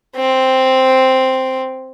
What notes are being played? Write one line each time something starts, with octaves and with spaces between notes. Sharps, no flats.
C4